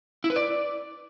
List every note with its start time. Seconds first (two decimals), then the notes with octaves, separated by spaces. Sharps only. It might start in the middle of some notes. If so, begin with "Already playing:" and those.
0.24 E4
0.30 B4
0.36 D5